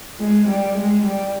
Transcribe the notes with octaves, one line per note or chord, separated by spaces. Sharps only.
G#3
G3
G#3
G3